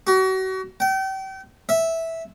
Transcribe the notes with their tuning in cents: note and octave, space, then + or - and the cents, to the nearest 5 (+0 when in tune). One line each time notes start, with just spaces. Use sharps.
F#4 +35
G5 -35
E5 -5